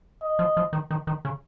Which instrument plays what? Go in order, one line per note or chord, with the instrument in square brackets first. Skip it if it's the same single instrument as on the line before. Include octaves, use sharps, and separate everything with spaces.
[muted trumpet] D#5
[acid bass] F3
F3
D#3
D#3
D#3
C#3